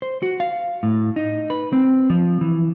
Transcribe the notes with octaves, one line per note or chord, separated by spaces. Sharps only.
C5
F#4
F5
A2
D#4
B4
C4
F3
E3